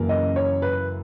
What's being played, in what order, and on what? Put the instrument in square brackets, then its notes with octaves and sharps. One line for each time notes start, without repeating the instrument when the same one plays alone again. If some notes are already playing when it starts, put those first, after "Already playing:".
Already playing: [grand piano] F#2 C#3 E3 A#3
D#5
C#5
B4